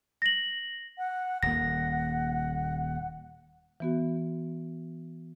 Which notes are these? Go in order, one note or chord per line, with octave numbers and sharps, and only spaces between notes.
A#6 F#7
F#5
D#1 A#3 F#5 A#6
E3 B3 F#4